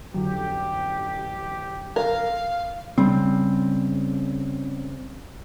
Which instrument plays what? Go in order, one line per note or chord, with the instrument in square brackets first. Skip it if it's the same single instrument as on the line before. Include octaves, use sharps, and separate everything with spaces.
[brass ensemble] A1 G4 [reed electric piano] F2 D3 F#3
[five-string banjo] A#4 [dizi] F5
[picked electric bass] C#3 G3 C4